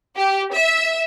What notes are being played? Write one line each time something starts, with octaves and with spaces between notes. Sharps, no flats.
G4
E5